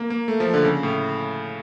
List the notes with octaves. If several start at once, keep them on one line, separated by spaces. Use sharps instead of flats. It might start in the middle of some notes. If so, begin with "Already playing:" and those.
Already playing: A#3
A#3
A3
F3
D3
C#3
A2